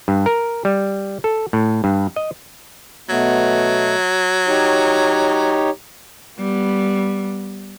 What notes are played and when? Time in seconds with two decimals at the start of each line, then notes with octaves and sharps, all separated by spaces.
0.08 G2
0.26 A#4
0.65 G3
1.24 A4
1.53 A2
1.84 G2
2.16 D#5
3.09 B2 F#3 A3 B3
4.47 D#4 G4 C#5
6.39 G3 B3